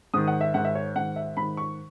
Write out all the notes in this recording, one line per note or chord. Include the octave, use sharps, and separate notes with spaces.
G#2 D#3 D#6
F#5
E5
G#2 D#3 F#5
E5
C#5
G#2 D#3 F#5
E5
G#2 D#3 B5
C#6